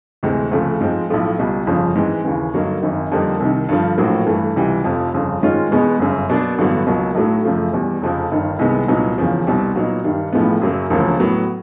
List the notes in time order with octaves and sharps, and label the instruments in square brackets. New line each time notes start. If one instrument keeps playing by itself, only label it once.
[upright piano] D2 C3 E3 G#3 C4
D2 C#3 F3 A3 C4
G#2 F3 G#3 C4
B1 A2 F3 A3
C#2 B2 G3
G1 F2 C#3 F3
G#2 E3 G#3 C4
D#2 C#3 E3
G2 D3 F#3 A#3 D#4
G#1 F#2 D#3
F2 D3 G3 A#3 D#4
C2 C3 D#3
G2 D3 F3
A#1 A2 F#3 A#3
G2 E3 A3
C#2 C3 E3 G3
F1 F2 C3 F3
G1 F2 C#3
G#2 D#3 G#3 C#4 F4
E2 B2 G#3 B3
G1 F#2 C#3
B2 F#3 A#3 D4
A1 G2 D3 F#3 B3
C#2 B2 F#3 A#3
B1 A2 F#3 A3
F#2 C#3 F3 A3
E2 B2 G3
F1 F2 C#3 F3
G1 G2 D#3
C2 C3 D#3 G#3 B3
C2 A#2 F#3 B3 D#4
E1 E2 C#3 F3
C2 B2 G3 C4
A#2 F#3 B3 D#4
G2 D#3 G3
B1 A2 F3 G#3 B3
F#2 C#3 F#3 A#3
E1 D2 C#3 F3 A#3
A2 F#3 B3